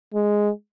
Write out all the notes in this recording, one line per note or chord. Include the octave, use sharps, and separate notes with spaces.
G#3